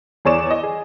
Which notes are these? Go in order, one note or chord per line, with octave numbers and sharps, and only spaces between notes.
E2 G#4 C#5 D5 C#6 E7
D#5
G#4